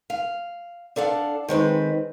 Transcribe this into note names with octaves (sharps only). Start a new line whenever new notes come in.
F5
D4 A4 F5 F#5
D#3 G#3 C4 B4